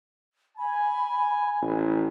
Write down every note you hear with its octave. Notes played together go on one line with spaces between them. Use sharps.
G#5 B5
A1